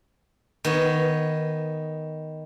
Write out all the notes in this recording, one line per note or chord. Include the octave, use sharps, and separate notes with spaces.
D#3 B3 C#5